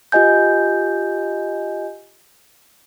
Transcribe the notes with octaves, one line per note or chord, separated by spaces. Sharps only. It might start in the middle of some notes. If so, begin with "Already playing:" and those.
F4 G4 D#5 G#5 G6